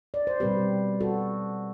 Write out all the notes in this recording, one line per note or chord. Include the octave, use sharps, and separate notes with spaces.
D5
C5
B2 G3 C4 G4 B4
F#4 A4